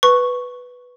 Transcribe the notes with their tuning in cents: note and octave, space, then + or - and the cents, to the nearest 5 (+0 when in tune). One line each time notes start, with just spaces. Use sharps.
B4 +0 C#6 +0